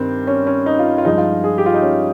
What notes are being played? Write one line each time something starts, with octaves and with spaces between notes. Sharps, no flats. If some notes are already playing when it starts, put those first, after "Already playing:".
Already playing: G2 D#3 G3 C4
C#4
C#4
D#4
F4
F4
G2 F3 G#3 D#4
F4
G#4
G4
F4
D#4
C#4